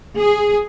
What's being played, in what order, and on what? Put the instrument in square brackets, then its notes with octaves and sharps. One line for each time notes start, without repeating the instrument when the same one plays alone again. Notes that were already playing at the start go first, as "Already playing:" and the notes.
[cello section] G#4